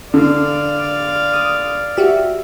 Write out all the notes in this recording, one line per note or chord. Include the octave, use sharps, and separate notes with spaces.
D3 D5 F5
D#6
F#4 G4 E5